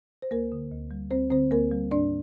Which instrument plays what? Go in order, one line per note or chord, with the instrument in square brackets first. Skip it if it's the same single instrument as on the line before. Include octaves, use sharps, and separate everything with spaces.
[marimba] C5
D2 A#3 A#4
D3
D2
G3
D2 C4 C5
D3 C4 C5
D2 A#3 A#4
G3
G#2 D4 D5